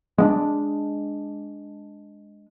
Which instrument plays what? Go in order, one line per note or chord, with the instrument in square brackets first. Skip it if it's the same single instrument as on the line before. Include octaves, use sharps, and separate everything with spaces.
[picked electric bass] G#3 A#3 D4